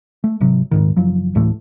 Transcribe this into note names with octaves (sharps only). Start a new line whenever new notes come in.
A3
G#1 C3 F#3
D#1 G#1 G#2 D#3
F#1 F3 F#3
D2 A2 E3 A3